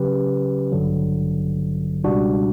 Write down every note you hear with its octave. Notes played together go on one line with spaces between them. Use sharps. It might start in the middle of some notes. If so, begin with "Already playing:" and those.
Already playing: C#3 F#3 C#4 G4 B4
A1 G2 D3 F#3
C#2 B2 G3 D4 F#4